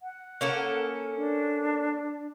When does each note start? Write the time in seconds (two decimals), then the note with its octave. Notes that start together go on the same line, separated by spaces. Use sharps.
0.01 F#5
0.41 A#3 C#4 A4
1.17 D4